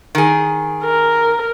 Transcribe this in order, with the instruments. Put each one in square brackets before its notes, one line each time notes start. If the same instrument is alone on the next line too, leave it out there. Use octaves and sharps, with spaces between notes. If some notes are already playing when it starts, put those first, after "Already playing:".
[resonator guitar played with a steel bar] D#3 G#4
[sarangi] A#4